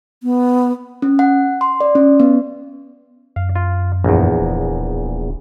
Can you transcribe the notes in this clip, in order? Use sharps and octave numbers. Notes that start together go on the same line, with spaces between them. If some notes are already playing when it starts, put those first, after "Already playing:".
B3
C#4
F#5
C6
D5
C#4
B3
F#2 F5
F4
A#1 E2
D1